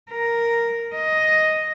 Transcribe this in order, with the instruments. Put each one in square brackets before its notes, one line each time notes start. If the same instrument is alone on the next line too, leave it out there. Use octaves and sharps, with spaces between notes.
[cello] A#4
D#5